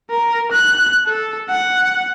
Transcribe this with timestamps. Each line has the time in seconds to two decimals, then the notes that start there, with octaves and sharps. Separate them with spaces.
0.10 A#4
0.52 F#6
1.07 A4
1.49 F#5